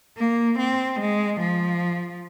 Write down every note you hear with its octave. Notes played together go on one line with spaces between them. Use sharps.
A#3
C4
G#3
F3